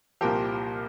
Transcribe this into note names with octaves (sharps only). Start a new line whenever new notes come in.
C2 A#2 F3 G4 A#4